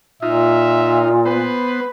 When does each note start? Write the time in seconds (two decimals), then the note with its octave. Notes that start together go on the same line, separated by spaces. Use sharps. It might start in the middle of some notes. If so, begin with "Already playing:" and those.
0.22 A#2 D#4 F4 E5
1.25 B3 B4 C5